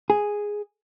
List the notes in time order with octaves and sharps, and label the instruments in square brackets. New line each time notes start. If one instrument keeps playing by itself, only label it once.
[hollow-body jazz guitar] G#4